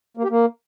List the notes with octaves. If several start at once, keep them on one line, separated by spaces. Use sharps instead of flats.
A#3
G4
A#3